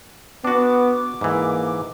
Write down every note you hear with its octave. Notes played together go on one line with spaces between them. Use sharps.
B3 D4 F#4 D6
G#2 E3 A#3